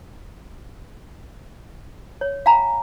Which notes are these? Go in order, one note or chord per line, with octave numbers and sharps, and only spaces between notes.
C#5
F5 F#5 G#5 A#5 B5